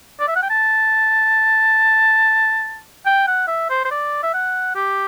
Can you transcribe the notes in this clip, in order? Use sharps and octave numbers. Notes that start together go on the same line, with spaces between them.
D5
E5
F#5
G5
A5
G5
F#5
E5
C5
C5
D5
E5
F#5
G4